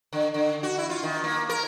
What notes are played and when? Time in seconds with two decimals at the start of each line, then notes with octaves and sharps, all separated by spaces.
0.13 D3
0.34 D3
0.63 F#4
0.78 E4
0.90 F4
1.03 D#3
1.24 A#3
1.49 A#4